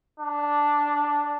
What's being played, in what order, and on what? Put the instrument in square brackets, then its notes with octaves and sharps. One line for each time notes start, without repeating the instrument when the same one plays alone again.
[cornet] D4